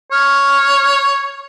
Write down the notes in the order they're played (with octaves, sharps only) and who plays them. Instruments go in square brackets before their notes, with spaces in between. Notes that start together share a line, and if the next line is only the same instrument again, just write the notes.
[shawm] C#5 [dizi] F6